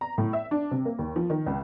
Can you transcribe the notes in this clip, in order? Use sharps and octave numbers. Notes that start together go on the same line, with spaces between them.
A#5
A2
E5
D4
C3
A#3
D#2
F3
D#3
C#2